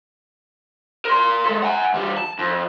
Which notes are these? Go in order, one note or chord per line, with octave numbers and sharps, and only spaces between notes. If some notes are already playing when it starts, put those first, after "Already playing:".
A#4 C6
G#3 A4
F#5 G#5
E3 G3
A5
F2